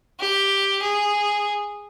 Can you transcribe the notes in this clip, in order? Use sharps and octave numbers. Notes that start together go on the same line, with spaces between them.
G4
G#4